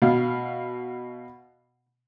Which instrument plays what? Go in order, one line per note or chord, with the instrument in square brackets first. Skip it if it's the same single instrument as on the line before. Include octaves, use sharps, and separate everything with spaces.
[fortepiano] B2 F5